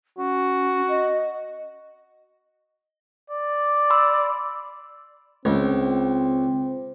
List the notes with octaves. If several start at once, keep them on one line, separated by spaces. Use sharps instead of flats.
C#4 F#4
D#5
D5
B5 C6 E6
C#2 C4